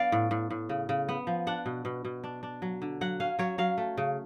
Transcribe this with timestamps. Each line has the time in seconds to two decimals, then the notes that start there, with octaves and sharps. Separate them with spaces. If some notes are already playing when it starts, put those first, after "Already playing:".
Already playing: B3 D4 D5 F5
0.12 A2
0.31 A2
0.50 A2
0.69 C#3
0.89 C#3
1.09 B3
1.27 F3
1.47 D4 F#5
1.66 B2
1.85 B2
2.05 B2
2.24 D4
2.43 D4
2.62 F#3
2.82 D3
3.01 F#3 F#5
3.20 C#4 F5
3.39 F#3 C#5
3.58 F#3 F5
3.78 A3
3.98 C#3